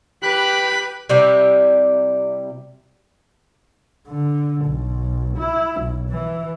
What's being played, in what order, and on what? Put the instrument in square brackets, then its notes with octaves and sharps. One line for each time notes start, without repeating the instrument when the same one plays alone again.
[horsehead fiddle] G4 B4 [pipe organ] B5 F#6
[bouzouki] C3 G3 E4 G4
[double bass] D3
B1
E4
B1
E3